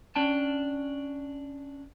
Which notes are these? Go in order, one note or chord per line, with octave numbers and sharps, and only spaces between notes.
C#4 D4 G5 A5